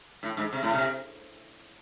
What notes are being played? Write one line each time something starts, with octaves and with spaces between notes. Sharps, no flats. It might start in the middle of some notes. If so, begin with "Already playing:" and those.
A2
G#2
C3
A2
C3